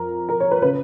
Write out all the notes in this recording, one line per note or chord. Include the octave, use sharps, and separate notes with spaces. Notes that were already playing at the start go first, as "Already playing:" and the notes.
Already playing: F2 A#4
A#4
C#5
B4
C#3 B4